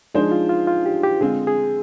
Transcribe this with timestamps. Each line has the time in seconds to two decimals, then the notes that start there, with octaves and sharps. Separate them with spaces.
0.14 F3 G#3 D4 D#4 G#4 C5
0.32 F4
0.49 F4
0.67 F4
0.86 G4
1.03 G4
1.21 D3 G#3 C4 F4 G#4
1.47 G#4